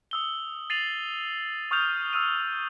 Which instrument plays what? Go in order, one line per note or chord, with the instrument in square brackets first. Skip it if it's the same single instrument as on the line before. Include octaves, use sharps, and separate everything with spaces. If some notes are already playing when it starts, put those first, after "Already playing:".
[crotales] D#6 E6 G7
A6 C7 D#7 F7 F#7
C#6 D#6 F6 G6 F7
E6 F6 D#7